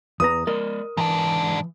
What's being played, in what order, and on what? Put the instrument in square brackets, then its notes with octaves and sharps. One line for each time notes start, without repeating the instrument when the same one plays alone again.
[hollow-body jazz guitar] E2 B4 A#5 [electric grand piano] D#6
[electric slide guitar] G#3 D5 D#5 [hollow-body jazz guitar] A#4
[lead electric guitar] G#2 D4 [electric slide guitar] E3